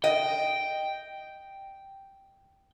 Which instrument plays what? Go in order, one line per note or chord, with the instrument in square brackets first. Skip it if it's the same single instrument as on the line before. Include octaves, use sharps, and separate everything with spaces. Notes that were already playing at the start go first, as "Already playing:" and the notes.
[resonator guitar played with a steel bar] D#5 [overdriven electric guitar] G5